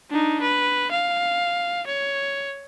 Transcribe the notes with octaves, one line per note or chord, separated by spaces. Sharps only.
D4 D#4
B4
F5
C#5